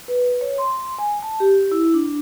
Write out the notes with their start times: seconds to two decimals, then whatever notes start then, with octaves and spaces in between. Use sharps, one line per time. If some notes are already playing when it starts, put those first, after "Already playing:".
0.08 B4
0.41 C#5
0.58 C6
0.99 G#5
1.23 A5
1.40 G4
1.72 E4
1.94 D4